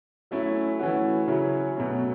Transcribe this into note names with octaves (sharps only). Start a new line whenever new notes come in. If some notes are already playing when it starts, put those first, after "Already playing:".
F#3 A3 C#4 E4
E3 A3 C#4 F#4
C#3 F#3 C#4 E4
B2 F#3 A3 C#4